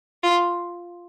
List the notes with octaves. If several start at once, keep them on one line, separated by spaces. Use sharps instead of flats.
F4